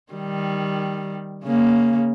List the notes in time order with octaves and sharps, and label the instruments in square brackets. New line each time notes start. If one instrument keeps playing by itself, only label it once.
[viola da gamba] D#3 G3
C#3 A#3